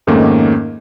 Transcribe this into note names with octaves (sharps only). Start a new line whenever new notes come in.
F2 G#2 D#3 A3 A#3 C#4